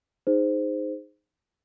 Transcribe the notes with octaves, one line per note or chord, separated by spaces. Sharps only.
D#4 G#4 C5